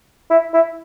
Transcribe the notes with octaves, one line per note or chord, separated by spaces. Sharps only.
E4
E4